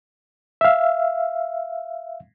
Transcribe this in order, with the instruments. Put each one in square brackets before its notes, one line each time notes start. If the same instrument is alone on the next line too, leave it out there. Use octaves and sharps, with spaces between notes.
[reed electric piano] E5 F5